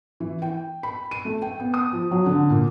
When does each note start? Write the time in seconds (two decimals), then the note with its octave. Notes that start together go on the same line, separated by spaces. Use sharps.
0.20 E3
0.42 G5
0.83 B5
1.11 D#7
1.25 A3
1.42 G5
1.60 B3
1.74 D#6
1.93 F3
2.11 F#3
2.26 D3
2.50 A#2